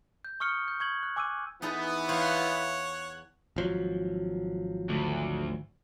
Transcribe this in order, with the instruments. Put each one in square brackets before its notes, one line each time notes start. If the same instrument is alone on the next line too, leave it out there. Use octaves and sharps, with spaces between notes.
[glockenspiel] G6
C#6 D#6 F6 C#7 G7
G6
C#6 G#6 F#7
F#6
G#5 D6 E6 F#6 D#7
[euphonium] E3 [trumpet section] B3 [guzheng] D#4 G#4 A4
[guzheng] E2 C5 F5 [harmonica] C#5 F#5
[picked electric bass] G#1 F3 F#3
[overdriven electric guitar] D2